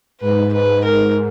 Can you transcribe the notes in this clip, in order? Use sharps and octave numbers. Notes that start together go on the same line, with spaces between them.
G#2 B4
B4
A#4